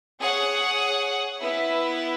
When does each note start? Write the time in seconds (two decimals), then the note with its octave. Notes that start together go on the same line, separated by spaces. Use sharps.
0.21 G#4 C#5 F#5
1.42 B3 E4 B4 E5